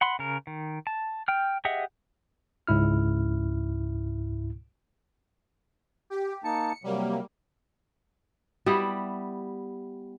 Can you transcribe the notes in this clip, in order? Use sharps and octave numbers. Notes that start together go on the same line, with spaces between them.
F#5 B5 C6
C#3 A#4
D#3
A5
G5 F6
G4 G#4 D#5 E5 F#5
C#2 G#2 E4 F6
G4
A#3 D#4 A5 C#7
C3 F#3 G3 A#3
G3 B3 E4 G4